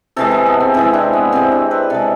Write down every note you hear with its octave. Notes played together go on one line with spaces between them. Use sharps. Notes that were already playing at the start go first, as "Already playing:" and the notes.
C3 E3 G#3 A4
A4
B3
C4
C3 E3 G#3 E4
D4
B3
C3 G#3 C4
D4
B4
C3 G#3 A4